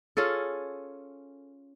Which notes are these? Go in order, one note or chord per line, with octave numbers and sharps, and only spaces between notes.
C#4 F4 G#4 A4